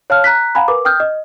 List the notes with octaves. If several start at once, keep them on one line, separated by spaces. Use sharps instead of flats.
C#5 F5 A5 F6
A#5 F#6 B6
F5 F#5 G#5 A#5 B5
A#4 B4 D6
G5 D#6 F6 G6
D#5